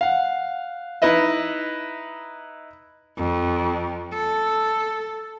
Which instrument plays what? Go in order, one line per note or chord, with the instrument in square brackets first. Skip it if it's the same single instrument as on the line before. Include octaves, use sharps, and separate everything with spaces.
[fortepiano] F5 F#5
D#4 E4 B4 D#5 E5
[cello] F2
A4